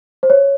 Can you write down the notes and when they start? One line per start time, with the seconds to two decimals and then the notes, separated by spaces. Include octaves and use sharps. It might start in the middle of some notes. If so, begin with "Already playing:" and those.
0.23 C5
0.30 C#5